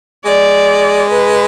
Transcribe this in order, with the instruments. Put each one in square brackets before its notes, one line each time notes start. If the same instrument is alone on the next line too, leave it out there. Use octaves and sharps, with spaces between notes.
[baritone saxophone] G#3 [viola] D5
[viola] B4